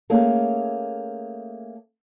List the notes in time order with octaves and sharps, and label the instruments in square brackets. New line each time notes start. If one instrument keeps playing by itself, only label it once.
[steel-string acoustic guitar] A3 A#3 C#4 G#4